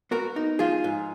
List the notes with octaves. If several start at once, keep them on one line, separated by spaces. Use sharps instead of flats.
B3 F#4 A#4
D#4
F3 F4 G#4
G#2